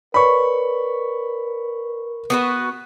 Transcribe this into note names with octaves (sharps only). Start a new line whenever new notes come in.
A#4 B4 C#5 D5 B5 C#6
B3 F#4 B4